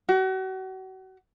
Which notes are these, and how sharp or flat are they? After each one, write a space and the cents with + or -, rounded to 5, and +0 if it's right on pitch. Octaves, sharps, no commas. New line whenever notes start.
F#4 +35